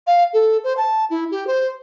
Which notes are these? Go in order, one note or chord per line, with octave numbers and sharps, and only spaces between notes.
F5
A4
C5
A5
E4
G4
C5